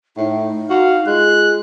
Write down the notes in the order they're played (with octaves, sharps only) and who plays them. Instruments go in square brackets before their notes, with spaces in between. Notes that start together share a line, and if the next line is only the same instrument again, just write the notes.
[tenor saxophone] A2 [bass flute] D#4
[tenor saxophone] F#4 [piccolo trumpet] F5
[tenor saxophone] G#3 [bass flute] F4 [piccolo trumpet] F#6